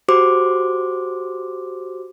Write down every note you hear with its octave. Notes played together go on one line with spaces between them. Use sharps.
F#4 G4 C5 C6 D6